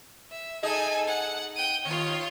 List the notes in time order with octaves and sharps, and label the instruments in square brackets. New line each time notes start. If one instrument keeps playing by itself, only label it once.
[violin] E5
[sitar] D#4 G#4 D#5 [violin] A4 G#5
[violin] F#5
G5 D#7
[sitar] D#2 D#3 [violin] F4 C#5